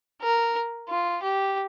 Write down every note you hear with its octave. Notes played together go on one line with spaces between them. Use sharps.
A#4
F4
G4